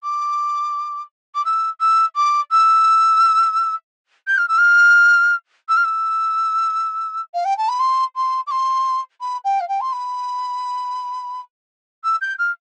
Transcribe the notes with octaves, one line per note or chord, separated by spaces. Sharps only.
D6
D6
E6
E6
D6
E6
G6
F6
E6
F6
E6
F6
E6
F5
G5
A5
B5
C6
C6
D6
C6
B5
G5
F5
G5
C6
B5
E6
G6
F6